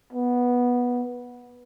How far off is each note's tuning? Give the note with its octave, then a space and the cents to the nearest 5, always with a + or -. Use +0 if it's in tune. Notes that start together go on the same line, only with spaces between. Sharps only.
B3 -10